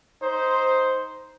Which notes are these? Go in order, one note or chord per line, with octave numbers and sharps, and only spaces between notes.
D#4 C5